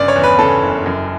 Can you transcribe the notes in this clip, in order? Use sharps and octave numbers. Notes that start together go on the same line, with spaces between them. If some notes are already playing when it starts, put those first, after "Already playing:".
Already playing: G1 C#3 D5
C#5
E2
B4
C#3 A4
F#1
F#2